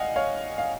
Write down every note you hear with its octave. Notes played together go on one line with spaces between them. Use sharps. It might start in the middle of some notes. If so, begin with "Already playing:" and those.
Already playing: D#4 D#5 F5 F#5 G#5
C#5 F5
F5